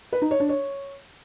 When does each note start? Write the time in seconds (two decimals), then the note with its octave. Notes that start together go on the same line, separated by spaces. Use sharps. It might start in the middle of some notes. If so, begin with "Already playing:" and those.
0.13 B4
0.22 D#4
0.31 C#5
0.40 D4
0.49 C#5